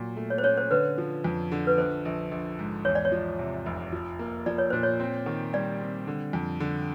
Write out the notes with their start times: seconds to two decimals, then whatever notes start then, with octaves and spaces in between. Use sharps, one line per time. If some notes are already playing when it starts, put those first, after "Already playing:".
Already playing: A#2 F#3
0.17 A3
0.30 C#5
0.38 C5
0.43 C#4 C#5
0.57 C5
0.71 D3 B4
0.98 F3
1.24 F2
1.52 D3
1.67 B4
1.78 A#1 C5
2.05 A#1
2.31 A#1
2.59 G#2
2.85 E2 C#5
2.95 D5
3.05 C#5
3.12 F3
3.39 C3
3.66 F1
3.92 F3
4.19 A#3
4.46 F3 D5
4.58 C#5
4.70 A#2 C5
4.83 C#5
5.00 C4
5.26 D#3
5.53 G3 D5
5.81 C4
6.07 D3
6.33 F2
6.60 D3